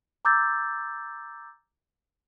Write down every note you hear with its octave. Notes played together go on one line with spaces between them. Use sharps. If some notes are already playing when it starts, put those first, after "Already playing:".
A#5 D6 E6 G6 A6